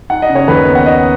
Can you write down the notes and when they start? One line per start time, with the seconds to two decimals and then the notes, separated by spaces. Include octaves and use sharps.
0.10 D#4 F#5
0.22 D#5
0.29 C#3
0.35 C#5
0.48 D#2 B4
0.67 B3
0.75 F#5
0.86 D#4 D#5